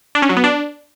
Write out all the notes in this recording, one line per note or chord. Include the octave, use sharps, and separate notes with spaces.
D4
C#4
F#3
B3
D4